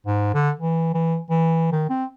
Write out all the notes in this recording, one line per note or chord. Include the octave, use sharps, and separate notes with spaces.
G#2
D3
E3
E3
E3
D#3
C4